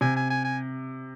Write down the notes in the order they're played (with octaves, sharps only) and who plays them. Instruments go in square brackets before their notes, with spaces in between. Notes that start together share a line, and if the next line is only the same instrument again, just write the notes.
[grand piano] C3 [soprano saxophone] G#5
[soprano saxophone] G#5
G#5
G#5